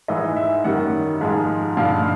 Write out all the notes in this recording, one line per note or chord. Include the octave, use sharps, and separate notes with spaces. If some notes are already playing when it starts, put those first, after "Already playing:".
G#2 E3 G#3 D#5
E5
F#2 D#3 G3 F#5
G#2 F3 G#3
G2 D3 F3 F5